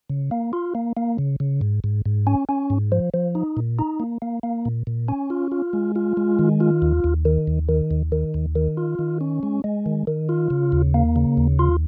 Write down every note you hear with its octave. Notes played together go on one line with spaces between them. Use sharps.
C#3
A#3
F4
A#3
A#3
C#3
C#3
G#2
G#2
G#2
C#4
C#4
G#2
F3
F3
D#4
A#2
D#4
A#3
A#3
A#3
A#2
A#2
C#4
F4
F4
G#3
F4
G#3
D#3
F4
D#2
D#2
D#3
D#2
D#3
D#2
D#3
D#2
D#3
F4
D#3
C#4
G#3
G#3
D#3
D#3
F4
C#3
D#2
A#3
C#3
D#2
F4